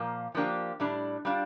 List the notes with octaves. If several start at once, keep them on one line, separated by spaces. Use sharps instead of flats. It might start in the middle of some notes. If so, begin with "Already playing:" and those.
Already playing: A#2 F3 A#3
F3 A#3 D4 G4
A2 G3 D4
G3 D4 F4